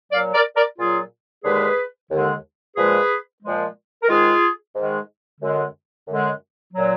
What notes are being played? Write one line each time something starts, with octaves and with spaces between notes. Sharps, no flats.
A#2 F#3 D5 F5
A#4 D5
A#4 D5
A#2 F#3 F4 G#4
D#2 D3 G#3 G#4 B4
D#2 D3 G#3
A#2 F3 G#3 G#4 B4
A#2 F3 G#3
A#4
G#2 D#3 G#3 F4 G#4
G#2 D#3 G#3
F#2 D3 G#3
F#2 D3 G#3
F#3
A#2